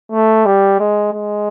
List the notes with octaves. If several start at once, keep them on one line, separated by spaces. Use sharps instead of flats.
A3
G3
G#3
G#3